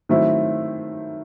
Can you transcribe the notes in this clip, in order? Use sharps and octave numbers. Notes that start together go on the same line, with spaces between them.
D#3 F#3 A3 C4 E4